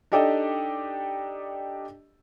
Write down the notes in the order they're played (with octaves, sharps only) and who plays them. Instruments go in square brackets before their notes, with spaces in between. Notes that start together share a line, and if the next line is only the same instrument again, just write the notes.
[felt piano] D4 D#4 G4 A4 D5 D#5